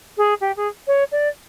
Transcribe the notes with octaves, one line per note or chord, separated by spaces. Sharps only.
G#4
G4
G#4
C#5
D5